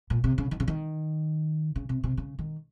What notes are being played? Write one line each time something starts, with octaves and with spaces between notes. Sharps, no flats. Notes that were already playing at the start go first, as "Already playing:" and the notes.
A#2
C3
C#3
D#3
C#3
D#3
C#3
C3
C3
C#3
D#3